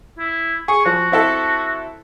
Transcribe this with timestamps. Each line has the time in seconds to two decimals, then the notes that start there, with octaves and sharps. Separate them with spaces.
0.19 E4
0.68 G#4 C#6
0.86 F3 F#4
1.12 C4 E4 A4